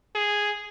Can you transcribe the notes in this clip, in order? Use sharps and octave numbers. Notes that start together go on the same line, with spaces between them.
G#4